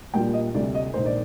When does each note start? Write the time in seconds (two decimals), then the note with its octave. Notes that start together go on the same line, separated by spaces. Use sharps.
0.14 A#2 G3 D4 F4 G5
0.33 D#5
0.54 D2 C3 G3 D5
0.75 D#5
0.94 A#1 G#2 D#3 C5
1.06 D5